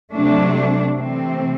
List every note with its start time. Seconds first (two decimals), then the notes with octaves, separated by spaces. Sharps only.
0.13 C3 F#3 A3 D4
0.98 C3 E3 A3 C4